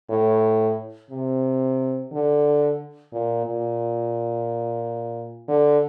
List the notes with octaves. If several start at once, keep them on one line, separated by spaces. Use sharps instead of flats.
A2
C3
D3
A#2
A#2
D3